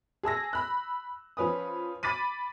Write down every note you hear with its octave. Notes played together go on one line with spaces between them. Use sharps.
G#4 A5 E6 A#6
B5 F#6
F3 C#4 B4 D#6
B5 D6 A6 B6 D#7